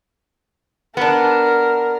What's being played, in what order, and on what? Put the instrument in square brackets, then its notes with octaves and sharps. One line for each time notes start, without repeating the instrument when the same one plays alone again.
[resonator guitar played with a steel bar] B3 D4 [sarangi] A#4